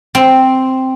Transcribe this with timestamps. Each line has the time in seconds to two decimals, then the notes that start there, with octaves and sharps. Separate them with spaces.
0.15 C4